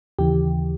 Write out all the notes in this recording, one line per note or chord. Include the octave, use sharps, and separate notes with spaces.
D#2 C#3 E3 G4